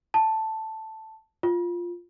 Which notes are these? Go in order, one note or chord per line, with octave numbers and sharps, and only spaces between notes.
A5
F4